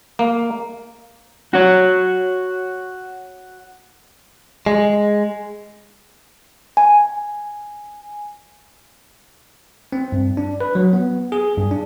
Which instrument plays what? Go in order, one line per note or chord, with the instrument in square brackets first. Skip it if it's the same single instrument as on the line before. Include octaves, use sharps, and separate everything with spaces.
[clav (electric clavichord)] A#3
[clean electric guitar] F#4 C#5
G#3
[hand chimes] G#5
[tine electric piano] C4
G2
D4
B4
F#3
B3
G#4
G2
D4